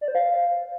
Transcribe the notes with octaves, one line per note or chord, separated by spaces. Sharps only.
D5
C5
F5